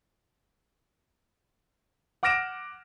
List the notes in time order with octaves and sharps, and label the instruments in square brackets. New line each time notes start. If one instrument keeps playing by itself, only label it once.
[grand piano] F#5 D6 F6 A#6 D7 E7